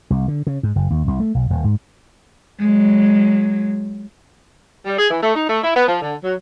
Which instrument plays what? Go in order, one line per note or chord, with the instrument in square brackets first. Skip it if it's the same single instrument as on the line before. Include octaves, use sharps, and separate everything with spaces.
[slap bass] C2
D3
C#3
G#2
F#1
D#2
C2
A3
B1
D#1
G#2
[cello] F#3 G#3
[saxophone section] G3
G#4
E3
A3
D#4
A3
E4
B3
F3
D3
F#3